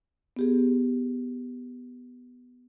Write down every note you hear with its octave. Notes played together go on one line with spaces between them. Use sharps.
B3 G4 G#4